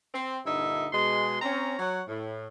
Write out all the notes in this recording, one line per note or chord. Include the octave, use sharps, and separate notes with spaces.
C4
G2 A#2 D3 D#4 E4 E5
B2 G#3 C6
C4 C#4 A#5
F#3 C#5 F#5
A2